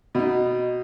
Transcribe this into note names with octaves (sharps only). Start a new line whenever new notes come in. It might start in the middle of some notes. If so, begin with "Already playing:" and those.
B2 D#4